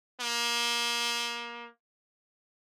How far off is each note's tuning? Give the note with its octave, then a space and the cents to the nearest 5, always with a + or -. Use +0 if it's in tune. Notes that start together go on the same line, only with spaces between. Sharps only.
A#3 +25